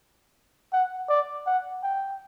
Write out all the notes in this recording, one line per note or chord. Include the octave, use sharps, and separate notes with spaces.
F#5
D5
F#5
G5